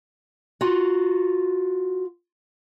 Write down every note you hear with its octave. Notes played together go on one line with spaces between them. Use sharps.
F4 F#4 A#5